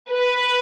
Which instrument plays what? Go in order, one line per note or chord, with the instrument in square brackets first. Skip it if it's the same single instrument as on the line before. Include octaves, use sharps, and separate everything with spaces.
[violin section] B4